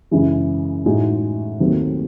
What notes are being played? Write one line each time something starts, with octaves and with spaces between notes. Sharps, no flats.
F#2 C#3 E3 G#3
A2 G#3 D#4 F#4
D#2 D#3 F#3 A3 C4